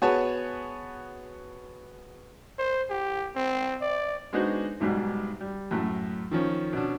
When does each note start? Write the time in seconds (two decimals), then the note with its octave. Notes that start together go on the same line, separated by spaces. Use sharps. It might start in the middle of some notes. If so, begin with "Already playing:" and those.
0.02 B3 F#4 G#4 B4 C#5 A5
2.59 C5
2.90 G4
3.36 C4
3.82 D5
4.33 G#3 B3 D4 D#4 F#4 C5
4.80 B1 G#2 B2 G3
5.40 G3
5.71 F#2 A2 A3
6.31 D#3 F3 C#4
6.73 B2 C#4 D4